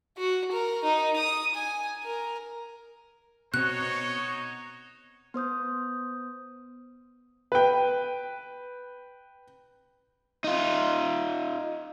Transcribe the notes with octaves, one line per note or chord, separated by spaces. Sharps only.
F#4
A#4
D#4
D#6
G#5
A#4
B2 C4 D#4 F#4 C#5 F#6
B3 C5 D#6 G6
B4 G5
D#4 F4